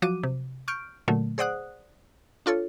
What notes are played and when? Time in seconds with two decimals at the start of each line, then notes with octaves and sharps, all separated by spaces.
0.02 F3 F#3 F#4 D6 D#7
0.23 C3
0.68 C#6 F6 G6 D7
1.08 A#2 D3 F#3 A3
1.38 G#4 C5 D5 F#5 D#6 F#6
2.46 D4 F4 A4 C#5